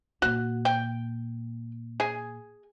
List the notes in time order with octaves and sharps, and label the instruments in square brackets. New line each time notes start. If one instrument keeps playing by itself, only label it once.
[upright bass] A#2 [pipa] F#4
[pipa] G5
G#4